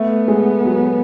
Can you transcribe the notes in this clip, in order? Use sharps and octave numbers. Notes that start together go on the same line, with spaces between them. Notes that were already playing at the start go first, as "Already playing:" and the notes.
Already playing: A3 B3
G#3
F#3